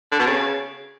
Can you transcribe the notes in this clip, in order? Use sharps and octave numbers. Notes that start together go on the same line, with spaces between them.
D3
B2
C#3